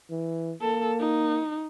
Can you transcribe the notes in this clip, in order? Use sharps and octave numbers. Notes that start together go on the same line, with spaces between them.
E3
A#3 A4
D#4